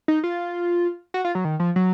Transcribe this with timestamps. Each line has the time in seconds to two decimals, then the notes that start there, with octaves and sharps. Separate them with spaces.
0.08 D#4
0.24 F4
1.14 F#4
1.25 F4
1.35 F#3
1.45 D#3
1.60 F3
1.76 F#3